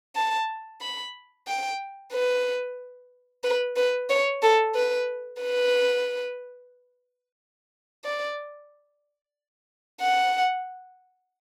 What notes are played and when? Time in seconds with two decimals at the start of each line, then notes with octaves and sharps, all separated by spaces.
0.15 A5
0.81 B5
1.47 G5
2.13 B4
3.44 B4
3.76 B4
4.10 C#5
4.42 A4
4.75 B4
5.42 B4
8.04 D5
10.01 F#5